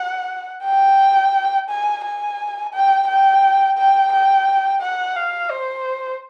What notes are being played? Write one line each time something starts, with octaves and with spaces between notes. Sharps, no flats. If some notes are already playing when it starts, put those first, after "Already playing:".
Already playing: F#5
G5
G#5
G#5
G5
G5
G5
G5
F#5
F5
C5